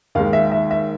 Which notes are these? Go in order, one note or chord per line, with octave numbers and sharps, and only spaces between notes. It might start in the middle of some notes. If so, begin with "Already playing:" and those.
D#2 D#3 G#3 F5
E5
E5
E5